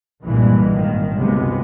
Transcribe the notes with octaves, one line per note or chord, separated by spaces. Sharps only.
C2 G2 A#2 E3 G#3
G#1 D#3 A#3
C#2 F#2 C3 G#3 B3